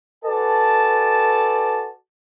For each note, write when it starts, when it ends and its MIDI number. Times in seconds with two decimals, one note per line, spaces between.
0.25 1.90 66
0.25 1.90 69
0.25 1.90 71
0.25 1.90 74
0.25 1.90 80
0.25 1.90 81